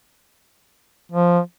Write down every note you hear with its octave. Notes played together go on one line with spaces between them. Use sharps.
F3